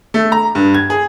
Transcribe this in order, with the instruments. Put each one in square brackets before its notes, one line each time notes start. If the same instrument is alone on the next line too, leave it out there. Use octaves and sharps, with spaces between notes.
[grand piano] A3
A#5
G2
G#6
G#4